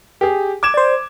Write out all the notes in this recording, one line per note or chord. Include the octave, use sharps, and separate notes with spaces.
G4 G#4
D6 G#6 E7
C5 D5